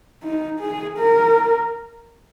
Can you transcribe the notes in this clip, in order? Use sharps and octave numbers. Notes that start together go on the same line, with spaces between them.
D#4
G#4
A#4